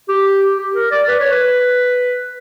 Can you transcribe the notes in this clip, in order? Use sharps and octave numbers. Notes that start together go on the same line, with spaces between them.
G4
G4
A#4
D5
B4
C#5
B4